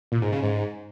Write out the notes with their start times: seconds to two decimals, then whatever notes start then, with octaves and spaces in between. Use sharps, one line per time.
0.12 A#2
0.22 G#2
0.32 C#3
0.43 G#2